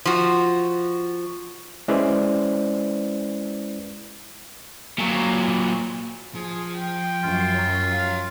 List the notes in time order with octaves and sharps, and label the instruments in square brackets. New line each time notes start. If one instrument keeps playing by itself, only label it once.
[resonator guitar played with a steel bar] F3 F#4
[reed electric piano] G#3 C#4 E4 B4 C5 D5
[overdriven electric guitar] A#2 F#3
[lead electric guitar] F3 [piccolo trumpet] G#4
[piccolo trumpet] G5
[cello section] F#2 [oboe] F4
[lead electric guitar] C#5 A#5
[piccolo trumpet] F5